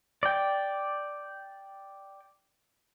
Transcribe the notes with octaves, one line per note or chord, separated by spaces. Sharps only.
D5 G5